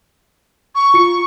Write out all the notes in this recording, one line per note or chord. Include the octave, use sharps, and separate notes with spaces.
C#6
F4 C#7